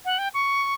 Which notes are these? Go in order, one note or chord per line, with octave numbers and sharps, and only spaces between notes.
F#5
G5
C#6